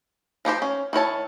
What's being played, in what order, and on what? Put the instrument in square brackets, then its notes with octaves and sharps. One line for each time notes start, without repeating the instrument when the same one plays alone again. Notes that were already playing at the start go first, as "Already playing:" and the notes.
[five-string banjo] F3 D#4 G4 C5
C#4
D#3 E4 C#5 A5